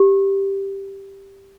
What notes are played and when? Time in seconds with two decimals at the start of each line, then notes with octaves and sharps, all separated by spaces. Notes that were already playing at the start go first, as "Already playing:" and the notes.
Already playing: G4